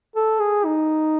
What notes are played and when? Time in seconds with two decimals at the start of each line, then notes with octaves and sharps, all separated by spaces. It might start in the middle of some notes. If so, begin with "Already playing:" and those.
0.16 A4
0.40 G#4
0.65 D#4